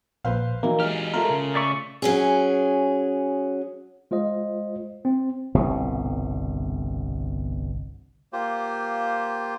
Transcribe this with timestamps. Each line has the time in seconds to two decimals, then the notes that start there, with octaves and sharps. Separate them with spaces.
0.24 A#1 B4 C5 F5
0.63 E3 F#3 A#3 D#4
0.80 G#3 G4 F6
1.13 A3 F4 A#4
1.30 C#3
1.55 D5 E5 C#6
2.02 F#3 C#4 G#4
4.11 G#3 F4 C5 D#5
5.05 C4
5.55 G1 C2 B2
8.33 A#3 F4 G4 C5